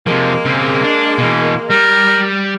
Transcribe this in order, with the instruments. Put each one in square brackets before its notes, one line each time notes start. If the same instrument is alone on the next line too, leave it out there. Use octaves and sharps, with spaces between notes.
[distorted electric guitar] C3 F3 [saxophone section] G#3 A#3
[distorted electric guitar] C#3 C4
D4
B2 E3
[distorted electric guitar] G3 [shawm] A#4